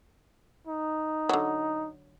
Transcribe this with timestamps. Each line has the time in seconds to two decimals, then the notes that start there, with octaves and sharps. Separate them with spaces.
0.67 D#4
1.29 D3 F#3